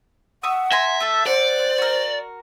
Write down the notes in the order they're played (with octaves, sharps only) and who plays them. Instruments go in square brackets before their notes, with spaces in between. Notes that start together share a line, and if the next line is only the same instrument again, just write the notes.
[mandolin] E5 C#6 D#6 [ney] F#5
[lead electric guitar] E5 [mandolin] G#5 A#5 C6
[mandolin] A3 A4
[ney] C5 [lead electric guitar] D5 [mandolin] F#5
[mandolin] F#4 A#4